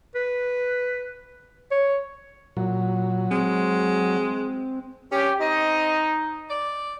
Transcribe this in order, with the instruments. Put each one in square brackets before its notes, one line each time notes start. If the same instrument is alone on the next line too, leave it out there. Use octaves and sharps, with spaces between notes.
[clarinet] B4
C#5
[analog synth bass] A#2 [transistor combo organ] F#3
[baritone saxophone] G#3 [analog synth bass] C4
[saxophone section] G2 C#4 [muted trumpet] G4
[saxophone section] C4 D#5 [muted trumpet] D#4
[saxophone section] D5